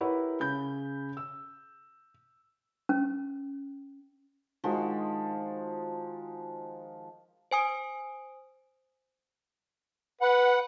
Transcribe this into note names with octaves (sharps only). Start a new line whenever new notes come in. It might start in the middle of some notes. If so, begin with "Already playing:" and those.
E4 G4 A#4 B4 C#5 F#5
C#3 C#4 B5 G6
E6
C#4
D#3 F3 G#3 F#4
C5 G#5 D#6 D7
B4 F#5